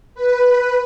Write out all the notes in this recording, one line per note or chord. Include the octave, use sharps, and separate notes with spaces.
B4